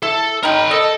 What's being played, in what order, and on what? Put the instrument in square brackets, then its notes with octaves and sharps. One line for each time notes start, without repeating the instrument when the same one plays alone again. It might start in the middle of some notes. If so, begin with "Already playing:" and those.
[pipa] E4 [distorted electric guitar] A4
[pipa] D#4 G5 [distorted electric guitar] A#4 B5
[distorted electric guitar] A4 [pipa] D#5